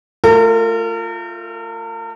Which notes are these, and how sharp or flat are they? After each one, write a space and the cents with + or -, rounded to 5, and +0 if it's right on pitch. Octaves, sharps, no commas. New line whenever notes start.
A3 +0 F4 +0 A#4 -40